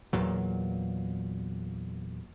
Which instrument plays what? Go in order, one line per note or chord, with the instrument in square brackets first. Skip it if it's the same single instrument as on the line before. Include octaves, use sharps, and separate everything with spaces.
[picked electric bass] E2 A#2 F#3